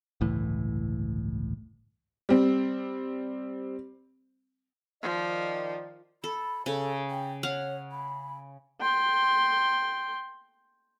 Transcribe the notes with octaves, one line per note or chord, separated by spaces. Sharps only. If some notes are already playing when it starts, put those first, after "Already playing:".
G1 C#2 A2 E3
G3 C4
D#3 F3 D5
A4 B5
C#3 A4
G5
C#5 F5 F#5
B5
G5 C6